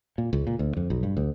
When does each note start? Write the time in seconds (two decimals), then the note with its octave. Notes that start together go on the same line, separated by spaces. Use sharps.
0.18 A#2
0.33 C#2
0.47 A#2
0.59 D2
0.77 F2
0.90 B1
1.03 G2
1.17 D2